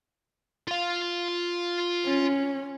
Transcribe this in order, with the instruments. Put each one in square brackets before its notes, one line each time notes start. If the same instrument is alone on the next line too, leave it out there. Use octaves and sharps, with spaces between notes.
[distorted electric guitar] F4 F5
[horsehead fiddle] C#4